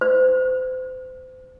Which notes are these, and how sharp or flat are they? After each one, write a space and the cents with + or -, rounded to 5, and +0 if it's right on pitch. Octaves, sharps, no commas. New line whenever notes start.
C5 -30